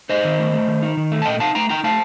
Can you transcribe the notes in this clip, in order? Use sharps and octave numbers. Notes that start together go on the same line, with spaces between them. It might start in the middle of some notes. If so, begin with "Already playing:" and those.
D#4 C5 D#5
D#3
A3
A3
D#3
D#4
D#3
A3
A5
A#2 D#5 G5
D#4 F5 A5
A3 G5 A#5
D#4 G5 A#5
A3 F5 A5